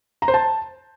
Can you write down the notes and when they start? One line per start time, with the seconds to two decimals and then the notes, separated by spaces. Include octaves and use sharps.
0.22 A#5
0.28 C5
0.34 A5